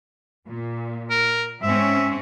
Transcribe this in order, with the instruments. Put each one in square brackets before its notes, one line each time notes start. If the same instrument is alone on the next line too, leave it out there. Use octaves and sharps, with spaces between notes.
[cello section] A#2
[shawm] A#4
[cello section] G#2 C4 C#4 [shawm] E5